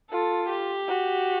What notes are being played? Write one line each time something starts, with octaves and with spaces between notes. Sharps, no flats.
F4 A4
G4
F#4